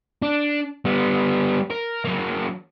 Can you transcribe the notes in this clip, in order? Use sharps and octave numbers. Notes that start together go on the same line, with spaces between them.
D4
G3 B3
A#4
F#3 A#3